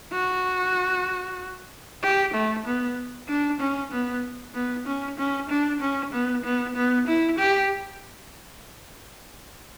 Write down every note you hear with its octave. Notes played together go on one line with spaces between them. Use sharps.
F#4
G4
A3
B3
D4
C#4
B3
B3
C#4
C#4
D4
C#4
B3
B3
B3
E4
G4